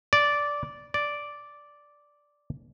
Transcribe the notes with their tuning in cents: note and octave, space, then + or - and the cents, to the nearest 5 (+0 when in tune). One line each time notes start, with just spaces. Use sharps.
D5 -10
D5 -5